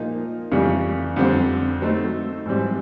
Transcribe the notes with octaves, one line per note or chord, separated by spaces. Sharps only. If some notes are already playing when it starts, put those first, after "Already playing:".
Already playing: A#2 F3 A#3 D#4
F2 C#3 E3 G3
F2 D3 G3 C4
F#3 A3 C4 D#4
G#2 E3 G3 C4